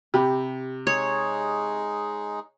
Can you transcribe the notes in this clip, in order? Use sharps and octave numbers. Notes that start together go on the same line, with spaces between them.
C3 G4 B5
G#3 D#4 G#4 C#5